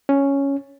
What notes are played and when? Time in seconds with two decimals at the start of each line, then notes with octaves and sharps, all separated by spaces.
0.09 C#4